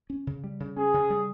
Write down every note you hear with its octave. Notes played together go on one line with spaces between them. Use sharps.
C#4
C#3
G3
C#3
C#4 G#4
C#3
G3